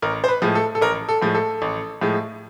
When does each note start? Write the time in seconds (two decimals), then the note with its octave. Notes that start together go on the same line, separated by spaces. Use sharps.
0.02 A1 A#4
0.24 C5
0.28 B4
0.42 A2 F3 G#3
0.55 A4
0.75 A4
0.82 A1 A#4
1.09 A4
1.22 A2 F3 G#3
1.35 A4
1.62 A1
2.01 A2 F3 G#3